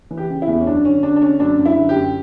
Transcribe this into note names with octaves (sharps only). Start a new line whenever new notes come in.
E3
G4
C#3
E4
E2
C#4
F#2 D4
D3 C#4
D3 D4
D4
D3 C#4
F#2 D4
F#2
E4
D3
G4
F#2